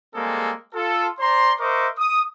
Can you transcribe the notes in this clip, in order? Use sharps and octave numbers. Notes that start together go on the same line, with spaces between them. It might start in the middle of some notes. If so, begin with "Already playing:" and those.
G3 G#3 A#3 C4 G#4 A4
F4 A4
C5 D5 A#5 C6
A#4 C5 D#5 E5 C#6 D6
D#6